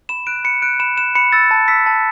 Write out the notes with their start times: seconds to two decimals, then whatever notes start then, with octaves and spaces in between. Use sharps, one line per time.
0.09 B5 E7
0.27 F#6 D7
0.45 B5 C#7
0.62 F#6 D7
0.80 B5 E7
0.97 F#6 E7
1.15 B5 C#7
1.32 E6 A6
1.51 A5
1.68 E6 B6
1.86 A5